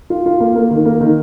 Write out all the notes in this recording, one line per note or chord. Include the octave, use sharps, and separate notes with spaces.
F4
F4
A#3
A#3
D#3
A#3
D#3